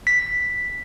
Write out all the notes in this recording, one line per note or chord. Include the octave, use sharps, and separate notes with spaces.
B6